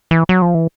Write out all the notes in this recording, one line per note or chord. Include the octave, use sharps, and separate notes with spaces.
E3
F#3
F3
E3